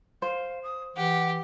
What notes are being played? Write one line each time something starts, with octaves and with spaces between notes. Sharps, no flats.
C5 F5
D#6
E3 G4 F#5